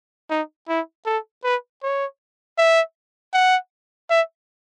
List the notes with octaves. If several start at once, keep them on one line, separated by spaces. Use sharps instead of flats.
D#4
E4
A4
B4
C#5
E5
F#5
E5